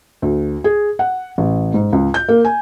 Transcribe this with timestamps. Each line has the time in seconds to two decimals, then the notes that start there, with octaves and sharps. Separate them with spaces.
0.22 D2
0.64 G#4
0.99 F#5
1.38 A1
1.74 G#2
1.93 C#2
2.14 G6
2.29 A#3
2.45 G#5